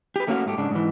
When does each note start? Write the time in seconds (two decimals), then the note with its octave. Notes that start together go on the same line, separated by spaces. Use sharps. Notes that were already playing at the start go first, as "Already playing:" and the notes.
0.16 G4 B4
0.28 A3 A#3 C#4 D4 F#4 F5
0.46 G#2 A3 G4
0.58 G#2 C#3 D4
0.71 G#2 E3